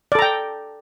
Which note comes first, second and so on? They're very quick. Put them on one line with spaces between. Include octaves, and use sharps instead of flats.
D5 A4 A#5 G5